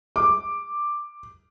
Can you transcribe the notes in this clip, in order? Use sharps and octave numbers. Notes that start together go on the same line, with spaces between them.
D6